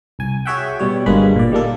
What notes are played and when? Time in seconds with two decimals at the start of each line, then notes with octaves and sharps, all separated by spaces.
0.19 C2 G#5
0.45 F#4 G#4 C#5 E5 F#5 G5
0.79 B2 G3 C#5
1.06 G1 G2 G#3 A#3 B4 B5
1.36 A#2 D5
1.51 D#3 G3 A#3 A4